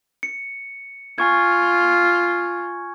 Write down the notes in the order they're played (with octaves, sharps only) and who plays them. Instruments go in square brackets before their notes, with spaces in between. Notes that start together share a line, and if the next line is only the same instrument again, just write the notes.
[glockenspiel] C#7
[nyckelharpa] F4 [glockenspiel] G#5 C#6 G#6